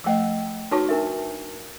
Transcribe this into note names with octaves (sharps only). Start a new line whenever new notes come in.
F3 A3 D#5 G5 E6
D#4 F#4 B4 C#5 A5 C#6
D4 A#4 E5